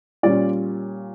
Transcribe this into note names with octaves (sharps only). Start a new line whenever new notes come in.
A#2 G3 C#4 F4 D5